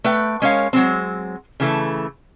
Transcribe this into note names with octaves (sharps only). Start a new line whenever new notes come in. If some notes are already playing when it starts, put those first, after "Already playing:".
A3 B4 G5
G#3 C#4 A#4 C#5 F5
F#3 G#3 C4
C#3 E3 A3